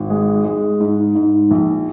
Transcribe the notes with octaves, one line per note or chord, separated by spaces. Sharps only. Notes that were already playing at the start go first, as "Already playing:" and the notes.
Already playing: G#1
G#3
G#3
G#2
G#2
A#1